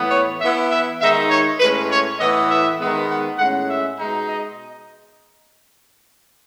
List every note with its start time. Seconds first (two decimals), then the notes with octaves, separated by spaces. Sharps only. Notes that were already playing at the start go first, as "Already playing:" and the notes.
Already playing: A2 E3 B3
0.11 C#5
0.40 E3 B3 E4 E5
0.71 E5
1.01 D#3 G#3 D#4 E5
1.30 C#5
1.60 A2 G#3 C#4 B4
1.90 C#5
2.19 A2 E3 B3 D#5
2.50 E5
2.80 D#3 G#3 B3
3.09 F#5
3.38 A2 G#3 C#4 F#5
3.69 E5
3.98 B2 G#3 D#4
4.28 D#5